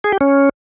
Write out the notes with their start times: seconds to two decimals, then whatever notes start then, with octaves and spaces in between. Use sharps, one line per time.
0.04 G#4
0.12 G4
0.21 C#4